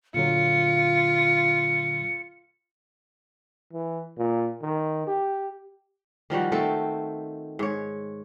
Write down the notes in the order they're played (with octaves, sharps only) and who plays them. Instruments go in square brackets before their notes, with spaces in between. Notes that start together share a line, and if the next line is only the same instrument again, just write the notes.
[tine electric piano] A#2 D3 F#3 [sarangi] F4 [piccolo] C#7
[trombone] E3
A#2
D#3
G4
[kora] D#3 F3 G3 F#4
D#3 A3 C4 A4
G#2 C#5